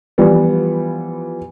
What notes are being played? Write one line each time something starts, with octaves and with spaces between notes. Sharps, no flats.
E3 F3 G3 B3